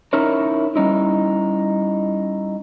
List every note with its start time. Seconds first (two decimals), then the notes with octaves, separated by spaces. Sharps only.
0.13 C#4 D#4 E4 A#4 C#5
0.76 G3 C#4 D#4 E4